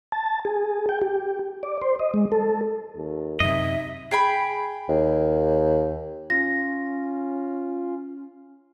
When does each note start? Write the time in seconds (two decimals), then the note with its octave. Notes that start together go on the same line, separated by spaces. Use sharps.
0.12 A5
0.45 G#4
0.89 G5
1.02 G4
1.63 D5
1.82 C5
1.99 D#5
2.14 G#3
2.32 A4
2.96 D#2
3.40 F#2 C3 D#4 D#5 E5
4.11 G#4 G5 B5
4.89 D#2
6.30 C#4 F4 A#6